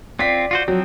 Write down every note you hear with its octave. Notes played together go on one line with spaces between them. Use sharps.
C4 F4 D5 B6
F4 F#4 C5
F3 F#3 C4